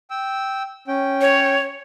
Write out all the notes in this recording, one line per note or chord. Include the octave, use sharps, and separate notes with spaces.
G5 E6
C#4 G5
C#5